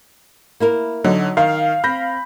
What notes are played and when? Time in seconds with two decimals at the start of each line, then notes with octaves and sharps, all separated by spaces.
0.60 A#3 E4 A#4
1.04 D3 F#3 D#4
1.37 D#3 F5
1.84 C4 B5 G6 A#6